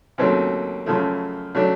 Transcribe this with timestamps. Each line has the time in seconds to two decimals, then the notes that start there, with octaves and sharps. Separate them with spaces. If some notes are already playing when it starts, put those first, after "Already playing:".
0.18 D#2 C#3 F#3 A3 C4
0.86 F#2 C#3 F3 A3
1.54 C#3 F#3 A3 D4